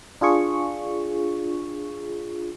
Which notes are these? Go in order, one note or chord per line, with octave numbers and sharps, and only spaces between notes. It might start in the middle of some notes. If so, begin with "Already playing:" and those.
D4 F4 G#4 C#6